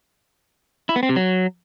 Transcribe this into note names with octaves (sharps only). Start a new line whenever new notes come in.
E4
B3
C4
C3
F#3